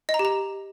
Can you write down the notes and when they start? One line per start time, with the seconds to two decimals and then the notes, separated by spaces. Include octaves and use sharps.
0.09 D#5
0.14 A#5
0.19 G4
0.25 A#5